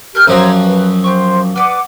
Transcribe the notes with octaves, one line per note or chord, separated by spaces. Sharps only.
G4 A#4 F6 G6
F#2 F3 F#3 G4 C5 C#5 A#5
B4
G4 C5 C6 C#6
B4 D5 F#5 D6 D#6